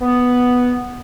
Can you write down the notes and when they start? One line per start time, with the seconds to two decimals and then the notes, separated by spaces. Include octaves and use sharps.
0.01 B3